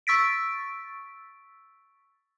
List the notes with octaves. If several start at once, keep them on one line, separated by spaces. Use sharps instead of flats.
C#6 E6 A6 B6 D7